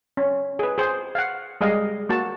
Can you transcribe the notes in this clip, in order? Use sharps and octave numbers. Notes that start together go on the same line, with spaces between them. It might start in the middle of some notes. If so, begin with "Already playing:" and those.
C#4
G#4 B4
G#4 C5
F5 F#5
G3 G#3 G#4 D#5 F5
A#3 F#4 A5